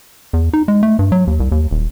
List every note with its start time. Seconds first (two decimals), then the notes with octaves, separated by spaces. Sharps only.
0.33 E2
0.53 D#4
0.68 G#3
0.83 A3
0.99 G2
1.12 F#3
1.27 D#2
1.40 C2
1.52 D#2
1.71 D#1